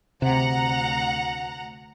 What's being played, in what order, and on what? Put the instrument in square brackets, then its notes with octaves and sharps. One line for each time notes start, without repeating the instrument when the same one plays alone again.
[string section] D2 F#5 A#5 [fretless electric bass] C3